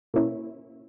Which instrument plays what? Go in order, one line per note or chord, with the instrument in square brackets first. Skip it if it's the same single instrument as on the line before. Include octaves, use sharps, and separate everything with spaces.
[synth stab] B2 A#3 C#4 E4